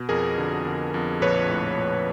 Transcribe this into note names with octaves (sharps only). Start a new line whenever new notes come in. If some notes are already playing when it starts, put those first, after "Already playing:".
Already playing: B2
F2 G#4 A#4
D3
D3
F2
A#1 B4 C#5
A2
A#1